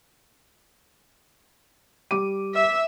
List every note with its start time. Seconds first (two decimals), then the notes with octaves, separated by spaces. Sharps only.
2.11 G3 D6 D#7
2.54 E5